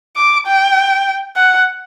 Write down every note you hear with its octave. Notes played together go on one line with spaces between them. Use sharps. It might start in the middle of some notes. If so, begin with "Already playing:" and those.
D6
G5
F#5